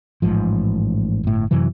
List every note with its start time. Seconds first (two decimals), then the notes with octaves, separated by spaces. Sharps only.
0.22 A1 G#2 F3
1.23 G1 A2
1.51 F#2 C3 E3 F#3